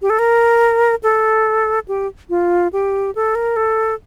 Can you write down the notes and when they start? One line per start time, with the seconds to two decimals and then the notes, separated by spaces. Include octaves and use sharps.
0.02 G4
0.10 A4
0.19 A#4
1.03 A4
1.88 G4
2.30 F4
2.73 G4
3.15 A4
3.35 A#4
3.56 A4